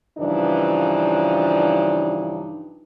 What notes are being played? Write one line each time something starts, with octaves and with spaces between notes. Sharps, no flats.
G2 C#3 E3 F3 D4 D#4